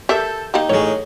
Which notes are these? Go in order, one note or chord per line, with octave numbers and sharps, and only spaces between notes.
G4 A4 A#4 E5 E6 G6
A#3 D#4 G4
A1 G#3 C#5